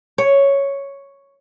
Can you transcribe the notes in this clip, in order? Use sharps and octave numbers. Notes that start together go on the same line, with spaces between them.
C#5